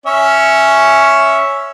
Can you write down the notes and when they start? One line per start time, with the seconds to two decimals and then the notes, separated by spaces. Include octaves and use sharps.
0.06 C#4 C#5 E5